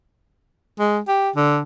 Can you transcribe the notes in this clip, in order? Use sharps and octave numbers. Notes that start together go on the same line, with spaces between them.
G#3
G4
D3